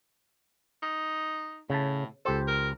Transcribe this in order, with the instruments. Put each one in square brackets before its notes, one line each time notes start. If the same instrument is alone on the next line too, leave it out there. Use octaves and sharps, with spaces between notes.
[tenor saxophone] D#4
[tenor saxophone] A2 [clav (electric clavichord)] C#3 A5
[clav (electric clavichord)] C#2 G4 C5 [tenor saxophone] A4
[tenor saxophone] A#4